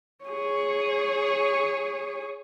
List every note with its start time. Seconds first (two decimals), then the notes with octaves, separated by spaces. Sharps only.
0.25 G#4 C#5